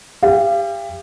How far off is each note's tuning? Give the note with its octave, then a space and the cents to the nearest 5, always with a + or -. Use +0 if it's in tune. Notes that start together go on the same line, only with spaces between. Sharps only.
G4 +30 F5 -35